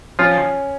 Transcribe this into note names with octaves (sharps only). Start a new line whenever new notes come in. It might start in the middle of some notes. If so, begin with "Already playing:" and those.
F3 C#4 F4